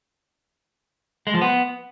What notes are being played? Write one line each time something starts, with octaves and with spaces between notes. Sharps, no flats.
G#3
F3
B3